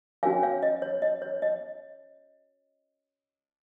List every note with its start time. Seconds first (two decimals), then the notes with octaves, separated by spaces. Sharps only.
0.23 C#4 F#4 A#4 C#5 F5 G#5
0.43 C#5 F5
0.63 D#5
0.82 C#5
1.02 D#5
1.22 C#5
1.42 D#5